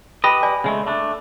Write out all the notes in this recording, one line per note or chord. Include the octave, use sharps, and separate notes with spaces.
G4 B4 D#5 B5
D5 G#5 B5
C#3 G#3 A3
A3 D4